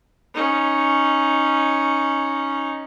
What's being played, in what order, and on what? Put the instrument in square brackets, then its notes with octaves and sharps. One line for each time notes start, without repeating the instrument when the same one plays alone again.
[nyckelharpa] C#4 D#4